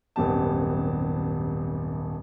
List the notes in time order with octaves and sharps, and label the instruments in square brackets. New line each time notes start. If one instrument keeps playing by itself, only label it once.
[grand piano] D#1 G#1 F#2 B3 G4 A5